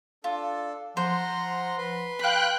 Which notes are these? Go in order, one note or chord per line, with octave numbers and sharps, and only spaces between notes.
D4 F4 A4
F3 C5 F#5 A#5 C6
B4 C6
F5 G5 B5 F#6